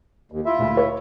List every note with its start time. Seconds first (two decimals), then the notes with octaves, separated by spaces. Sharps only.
0.32 D#2
0.46 E4 F4 E5
0.59 D2 A#2
0.77 C#5